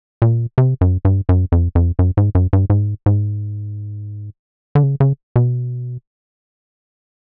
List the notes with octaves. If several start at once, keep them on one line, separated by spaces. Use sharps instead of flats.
A#2
C3
F#2
G2
F#2
F2
F2
F#2
G#2
F#2
G2
G#2
G#2
D3
C#3
C#3
B2